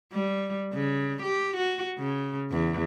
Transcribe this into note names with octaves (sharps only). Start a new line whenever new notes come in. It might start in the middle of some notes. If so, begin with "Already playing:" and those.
G3
C#3
G4
F#4
C#3
E2